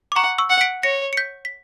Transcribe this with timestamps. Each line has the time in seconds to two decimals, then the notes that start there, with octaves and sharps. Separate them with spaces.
0.12 D6
0.15 F#5 A#5 C#6
0.38 C#6 E6
0.50 F#5
0.61 B6 D7
0.83 C#5 A#6 C#7
1.13 C#7
1.17 G6 B6
1.45 B6